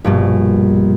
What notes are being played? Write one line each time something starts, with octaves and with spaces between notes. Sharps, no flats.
A#1 G2 B2